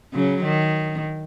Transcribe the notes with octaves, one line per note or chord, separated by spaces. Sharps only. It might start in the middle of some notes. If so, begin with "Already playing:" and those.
C#3 F#3
D#3